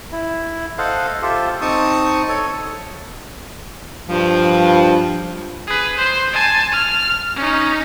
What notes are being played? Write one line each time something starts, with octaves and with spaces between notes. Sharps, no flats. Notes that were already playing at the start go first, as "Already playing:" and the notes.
E4
A4 C5 D#5 F5 F#5
F4 G4 A4 C5 E5
C4 D#4 A5 C#6 D#6
A4 C#5
G2 F3
G#4 B4
C5 C6
G#5 A5
F6
C#4 D#4